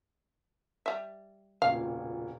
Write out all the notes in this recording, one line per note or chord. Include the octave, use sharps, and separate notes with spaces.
G3 E5
E1 C#2 A#2 F5